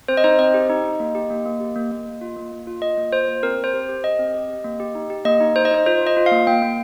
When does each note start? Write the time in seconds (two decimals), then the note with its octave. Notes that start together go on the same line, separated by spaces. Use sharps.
0.08 C4 C5
0.17 D#5
0.24 D#4 C5
0.39 C4 D#5
0.54 G4
0.70 D#4
0.84 D#4
1.00 A#3
1.15 G4
1.30 A#3
1.46 A#3
1.61 G4
1.76 A#3
1.91 A#3
2.06 A#3
2.21 F4
2.37 A#3
2.52 A#3
2.67 F4
2.82 F4 D#5
2.97 A#3
3.12 F4 C5
3.28 A#3
3.43 C4 A#4
3.59 C4
3.64 C5
3.74 G4
3.89 G4
4.04 G4 D#5
4.19 C4
4.34 G4
4.50 G4
4.64 A#3
4.80 G4
4.95 D#4
5.10 G4
5.25 A#3 D#5
5.40 D#4
5.56 D#4 C5
5.65 D#5
5.71 D#4 C5
5.86 F4 C5
6.01 F4
6.07 D#5
6.17 F4
6.26 F5
6.32 A#3
6.47 A#3 G5
6.62 A#3